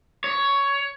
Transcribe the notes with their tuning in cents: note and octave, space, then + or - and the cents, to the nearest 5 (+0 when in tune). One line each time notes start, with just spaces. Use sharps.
C#5 +10